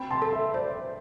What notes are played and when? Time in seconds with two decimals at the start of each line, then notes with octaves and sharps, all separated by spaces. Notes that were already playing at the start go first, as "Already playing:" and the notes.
Already playing: C4 G5 B5
0.10 A5 C6
0.22 A4
0.32 E5
0.54 C5 D5